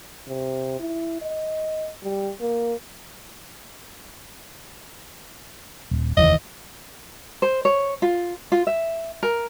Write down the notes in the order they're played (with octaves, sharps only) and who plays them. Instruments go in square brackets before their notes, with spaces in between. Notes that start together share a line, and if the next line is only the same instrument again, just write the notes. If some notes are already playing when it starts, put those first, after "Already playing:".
[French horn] C3
E4
D#5
G3
A#3
[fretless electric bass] D#1
[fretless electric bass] F1 D#2 E3 [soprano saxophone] D#5
[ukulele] C5
C#5
F4
F4
E5
A#4